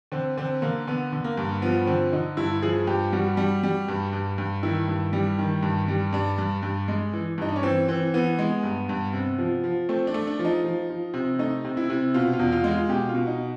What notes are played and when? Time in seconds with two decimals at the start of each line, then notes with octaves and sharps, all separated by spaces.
0.12 D3 C4
0.37 D3 C4
0.62 D3 A#3
0.87 D3 B3
1.12 D3
1.24 A#3
1.37 G2
1.62 F3 B3
1.87 D3 C4
2.12 D3 D#4
2.37 G2 E4
2.62 F3 G#4
2.87 G2 G4
3.12 G3 F#4
3.37 G3
3.63 G3
3.88 G2
4.13 G2
4.38 G2
4.63 D#3 E4
4.88 G2
5.13 G3
5.39 D#3
5.63 G2
5.88 G3
6.13 G2 D4
6.38 G2
6.63 G2
6.88 G#3
7.13 E3
7.38 G2 D#4
7.49 D4
7.56 C#4
7.63 E3 C4
7.88 E3 C4
8.14 E3 B3
8.39 G#3
8.63 G2
8.89 G2
9.13 C3
9.38 F3
9.64 F3
9.89 A3 C4
10.07 D4
10.14 A3
10.27 D4
10.39 F3
10.45 D#4
10.64 F3
10.89 F3
11.14 C3
11.39 A3 D#4
11.64 C3
11.77 E4
11.90 C3
12.14 B2 F4
12.33 F4
12.39 E2
12.52 F4
12.64 G#3
12.71 F4
12.89 B2 G4
13.09 F4
13.14 B2
13.27 D#4